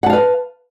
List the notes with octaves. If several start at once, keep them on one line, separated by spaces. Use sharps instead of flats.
B4 F5 F#5 A5